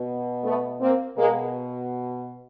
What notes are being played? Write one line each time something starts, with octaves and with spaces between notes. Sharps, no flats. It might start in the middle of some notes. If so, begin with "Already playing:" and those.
Already playing: B2
A3 B3
A#3 C4
B2 G#3 A#3